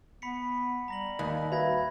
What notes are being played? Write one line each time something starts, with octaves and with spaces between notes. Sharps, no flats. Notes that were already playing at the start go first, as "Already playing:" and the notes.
B3 B5 B6 C#7
G3 A#5 A#6 F#7
D#2 F#6
F#4 B4 E5 B5 G#6 A#6